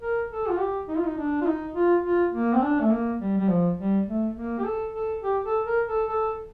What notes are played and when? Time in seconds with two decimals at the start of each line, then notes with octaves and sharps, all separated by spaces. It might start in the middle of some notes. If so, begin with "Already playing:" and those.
0.01 A#4
0.30 A4
0.49 F4
0.59 G4
0.88 D#4
0.97 F4
1.05 D#4
1.17 D4
1.41 F4
1.46 D#4
1.74 F4
2.04 F4
2.33 A#3
2.54 C4
2.62 D4
2.80 A3
2.91 A#3
3.19 G3
3.38 G3
3.48 F3
3.78 G3
4.06 A3
4.35 A#3
4.58 G4
4.64 A4
4.93 A4
5.22 G4
5.44 A4
5.65 A#4
5.87 A4
6.09 A4